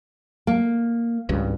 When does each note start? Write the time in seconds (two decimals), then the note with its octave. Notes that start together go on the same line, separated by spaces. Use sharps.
0.47 A#3
1.29 G#1 C#2 G2